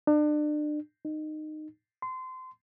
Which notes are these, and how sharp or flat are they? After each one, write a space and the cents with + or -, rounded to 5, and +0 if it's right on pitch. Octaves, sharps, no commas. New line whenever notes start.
D4 +35
D#4 -15
C6 -25